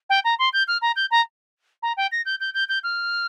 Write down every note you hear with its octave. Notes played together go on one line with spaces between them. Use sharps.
G5
A#5
C6
G6
F6
A#5
G6
A#5
A#5
G5
A#6
G6
G6
G6
G6
F6